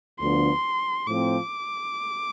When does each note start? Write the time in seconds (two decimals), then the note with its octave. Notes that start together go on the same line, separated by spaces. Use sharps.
0.19 D2 D3 F3 B3 D4 C6
1.07 A2 F3 C4 D6